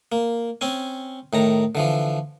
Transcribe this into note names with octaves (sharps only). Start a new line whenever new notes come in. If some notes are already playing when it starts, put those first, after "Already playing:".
A#3
C4 C#4 G#5
A2 D#3 A#5
D3 E3 F3